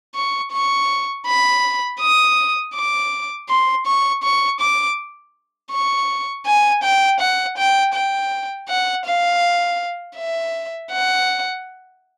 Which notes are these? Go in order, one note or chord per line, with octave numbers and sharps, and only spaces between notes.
C#6
C#6
B5
D#6
D6
C6
C#6
C#6
D6
C#6
G#5
G5
F#5
G5
G5
F#5
F5
E5
F#5